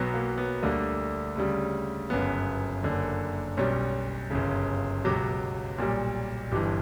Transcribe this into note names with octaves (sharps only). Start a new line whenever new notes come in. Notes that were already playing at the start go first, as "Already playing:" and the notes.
Already playing: B1 B2 F#3 B3
A#3
B3
D2 D3 G3 A#3
D2 C#3 G3
G1 F#2 C#3 B3
F#1 F#2 D3
B1 B2 G3 C#4
G1 F#2 C#3
C#2 B2 F#3 G4
B1 A#2 G3
G1 G2 E3 G4